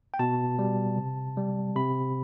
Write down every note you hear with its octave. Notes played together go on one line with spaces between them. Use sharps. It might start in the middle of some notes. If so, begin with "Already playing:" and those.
G5
B2 A5
G3
C3
G3
C3 B5